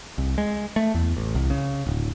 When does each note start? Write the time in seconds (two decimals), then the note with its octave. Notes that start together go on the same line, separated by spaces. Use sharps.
0.18 C2
0.38 G#3
0.76 A3
0.94 E2
1.17 A1
1.35 C2
1.50 C#3
1.87 D1